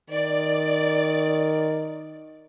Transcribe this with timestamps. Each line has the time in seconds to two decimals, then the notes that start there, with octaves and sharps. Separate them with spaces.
0.10 D#3 D5